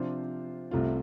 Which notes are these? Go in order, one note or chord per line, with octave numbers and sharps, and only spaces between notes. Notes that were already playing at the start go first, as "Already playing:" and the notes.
Already playing: C3 F3 D4 F4 C5
C2 C3 A3 F4